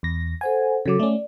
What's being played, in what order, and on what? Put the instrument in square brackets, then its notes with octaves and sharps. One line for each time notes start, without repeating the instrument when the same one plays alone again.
[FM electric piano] E2 A#6
[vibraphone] A4 C5 F#5 [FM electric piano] G#5
[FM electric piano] C#3 F#3 [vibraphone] A4 D6
[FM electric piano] A3 C#4 [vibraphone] D5